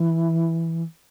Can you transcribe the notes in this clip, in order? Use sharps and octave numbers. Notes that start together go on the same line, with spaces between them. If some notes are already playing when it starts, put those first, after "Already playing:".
Already playing: E3